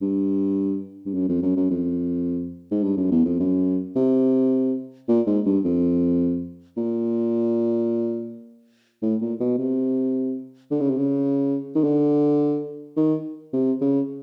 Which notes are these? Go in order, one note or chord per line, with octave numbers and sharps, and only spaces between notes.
G2
G2
F#2
F2
F#2
F#2
F2
G#2
G2
F#2
E2
F2
F#2
C3
A#2
G#2
G2
F2
A#2
A2
A#2
B2
C3
D3
C#3
C3
C#3
D#3
D3
D#3
C3
C#3